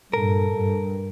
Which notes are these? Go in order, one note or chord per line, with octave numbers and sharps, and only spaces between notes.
G2 A#2 A4 A#4
G2